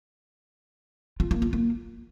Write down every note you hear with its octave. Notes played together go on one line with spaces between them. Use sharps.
F4
A#3
F4
A#3